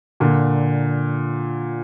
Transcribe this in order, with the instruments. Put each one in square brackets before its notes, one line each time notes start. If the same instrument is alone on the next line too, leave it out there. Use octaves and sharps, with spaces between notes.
[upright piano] A#2 D3